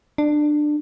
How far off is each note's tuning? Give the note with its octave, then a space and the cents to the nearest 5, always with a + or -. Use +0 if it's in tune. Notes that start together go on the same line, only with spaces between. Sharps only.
D4 +20